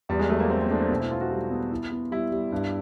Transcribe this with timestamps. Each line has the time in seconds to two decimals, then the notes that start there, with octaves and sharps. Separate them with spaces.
0.09 E2 G3
0.19 G#3
0.30 F#3 A3
0.40 A#3
0.50 A3 C4
0.60 C4
0.70 A3 D4
0.80 C4
0.90 B2 C4
1.00 E4
1.10 B3 F4
1.21 F#4
1.31 G3 F4
1.51 B3
1.72 E4
1.92 B3
2.11 G3 E4
2.32 G3
2.52 G2